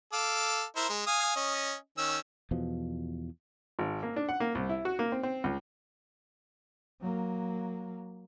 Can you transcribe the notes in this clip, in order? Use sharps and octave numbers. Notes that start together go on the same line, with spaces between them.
A4 F5 D6
E4 A#4 C5
G#3
F5 G#5 D#6
C#4 D#5
D#3 C#4 E6
E2 B2 F3
G#1
A#3
D4
F#5
A#3
C2
E4
F#4
A#3
C4
C4
C#2
F#3 A#3